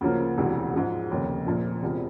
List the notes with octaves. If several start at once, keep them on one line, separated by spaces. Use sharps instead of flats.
D2 C#3 F3 A#3
E1 D2 C3 E3
G#2 F3 G#3
F1 D#2 C#3
A#1 A#2 F3
E1 E2 C3 F3